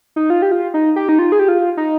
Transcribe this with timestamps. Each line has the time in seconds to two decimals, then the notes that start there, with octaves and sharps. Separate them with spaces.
0.16 D#4
0.30 F4
0.42 G4
0.52 F4
0.74 D#4
0.96 G4
1.09 D#4
1.19 F4
1.32 G#4
1.39 G4
1.48 F4
1.77 D#4